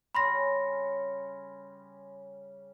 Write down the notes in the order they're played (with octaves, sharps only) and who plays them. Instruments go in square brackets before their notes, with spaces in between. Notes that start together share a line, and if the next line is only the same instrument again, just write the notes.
[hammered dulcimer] C#3 G3 C#4 [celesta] B5 C6 A#6